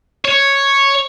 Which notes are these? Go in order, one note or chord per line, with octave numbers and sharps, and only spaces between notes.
C#5